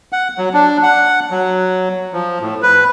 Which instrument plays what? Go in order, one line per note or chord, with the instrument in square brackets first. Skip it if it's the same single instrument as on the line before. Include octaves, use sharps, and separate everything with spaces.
[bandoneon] F#5
F#3
D4
F#5
F#3
F3
A2
B4